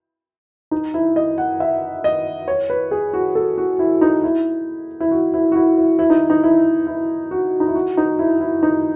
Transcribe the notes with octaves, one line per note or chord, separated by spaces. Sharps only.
D#4
E4
D#5
F#5
E5
D#5
C#5
B4
G#4
F#4
A4
F#4
E4
D#4
E4
E4
F#4
E4
F#4
E4
E4
E4
D#4
D#4
E4
E4
F#4
D#4
E4
F#4
D#4
E4
E4
D#4